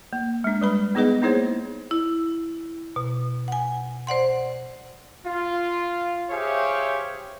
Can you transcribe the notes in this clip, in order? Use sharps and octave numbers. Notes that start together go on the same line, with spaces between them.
A#3
G#3 D4
G3 B4 B5
B3 D#4 G#4 B4 D#5 F#5
A#3 D#4 E4 G#4 C5 C#5
E4
B2
F#5 G#5
C5 D5 F#5 C6
F4
G4 G#4 C5 C#5 E5 F5